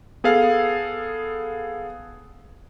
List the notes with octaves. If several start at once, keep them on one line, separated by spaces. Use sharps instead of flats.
B3 G#4 A4 F5